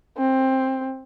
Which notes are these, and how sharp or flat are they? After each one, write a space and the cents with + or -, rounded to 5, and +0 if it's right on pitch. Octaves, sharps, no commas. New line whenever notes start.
C4 +15